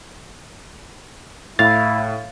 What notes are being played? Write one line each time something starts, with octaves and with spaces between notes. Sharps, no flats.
A2 E4 F5 A6